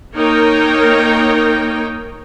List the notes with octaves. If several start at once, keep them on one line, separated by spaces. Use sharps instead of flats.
A#3 D#4 A#4 C#5 G5